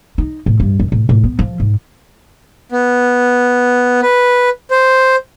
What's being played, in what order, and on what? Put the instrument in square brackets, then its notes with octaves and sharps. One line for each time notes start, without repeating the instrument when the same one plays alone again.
[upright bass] D#4
A2
G2
F#2
A2
A2
B3
F3
G#2
[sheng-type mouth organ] B3
B4
C5